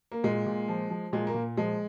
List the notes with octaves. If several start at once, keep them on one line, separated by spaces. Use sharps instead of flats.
A#3
A#2 G#3
A#2
F3
F3
A#2 G#3
A#3
A#2
F3 G#3